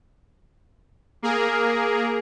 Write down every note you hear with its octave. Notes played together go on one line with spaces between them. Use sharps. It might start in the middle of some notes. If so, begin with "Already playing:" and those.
A#3 G#4 A#4